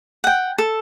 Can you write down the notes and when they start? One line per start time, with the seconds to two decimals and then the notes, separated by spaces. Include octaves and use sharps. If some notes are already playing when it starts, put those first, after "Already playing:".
0.24 F#5 G5
0.58 A4